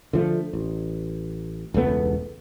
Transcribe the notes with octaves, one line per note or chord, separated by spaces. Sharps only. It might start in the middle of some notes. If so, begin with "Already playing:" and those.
D3 F3 A3
A1
E1 C#2 A3 B3